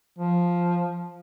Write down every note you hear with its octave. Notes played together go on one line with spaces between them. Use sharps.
F3